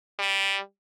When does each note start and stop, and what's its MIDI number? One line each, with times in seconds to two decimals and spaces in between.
0.19 0.59 55